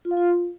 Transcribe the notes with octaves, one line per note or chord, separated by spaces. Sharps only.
F4
F5
F4